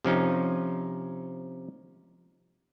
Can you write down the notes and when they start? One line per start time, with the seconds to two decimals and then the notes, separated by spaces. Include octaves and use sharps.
0.05 C3 F3 C#4 D#4